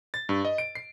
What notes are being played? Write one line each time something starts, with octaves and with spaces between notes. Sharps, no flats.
A6
G2
D#5
D7
C7